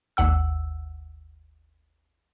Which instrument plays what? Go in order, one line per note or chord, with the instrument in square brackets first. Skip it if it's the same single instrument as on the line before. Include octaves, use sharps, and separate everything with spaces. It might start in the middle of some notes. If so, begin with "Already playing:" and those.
[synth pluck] G#1 D#2 F#5 E6